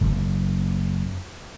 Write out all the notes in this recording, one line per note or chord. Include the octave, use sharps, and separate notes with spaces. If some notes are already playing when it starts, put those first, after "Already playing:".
F#1